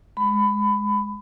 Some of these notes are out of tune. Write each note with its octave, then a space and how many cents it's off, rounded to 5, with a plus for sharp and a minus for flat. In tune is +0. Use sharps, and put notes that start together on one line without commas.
G#3 +0 B5 +20